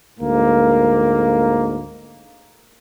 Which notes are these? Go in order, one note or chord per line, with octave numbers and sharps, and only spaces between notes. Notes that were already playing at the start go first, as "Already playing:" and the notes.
D2 G#2 A#3